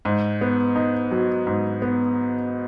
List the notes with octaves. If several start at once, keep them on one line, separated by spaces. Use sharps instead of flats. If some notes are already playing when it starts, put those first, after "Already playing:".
G#2
B3
D#4
F#3
G#2
B3